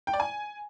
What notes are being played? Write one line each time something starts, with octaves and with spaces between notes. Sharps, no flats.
G5
D5
G#5